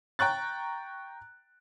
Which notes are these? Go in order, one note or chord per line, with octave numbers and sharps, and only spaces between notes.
G5 A#5 C#6 F#6 A6